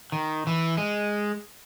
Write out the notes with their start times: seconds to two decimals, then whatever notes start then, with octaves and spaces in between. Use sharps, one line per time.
0.12 D#3
0.47 E3
0.77 G#3